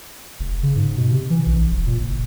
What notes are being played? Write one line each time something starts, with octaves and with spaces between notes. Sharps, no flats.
F1
C#3
G#2
B2
C3
E3
A#1
E1
A#2
F#1